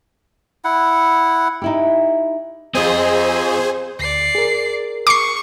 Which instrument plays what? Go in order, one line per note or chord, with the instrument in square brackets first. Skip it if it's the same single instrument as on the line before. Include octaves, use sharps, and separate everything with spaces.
[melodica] E4 F#5
[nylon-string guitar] D#4 E4 G4
[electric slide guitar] C4 F4 [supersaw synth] G#4 C5 [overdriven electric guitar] D#5
[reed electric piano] D2 [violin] D5 C7
[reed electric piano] G#4 A#4
[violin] C#6 [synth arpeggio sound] D6 C7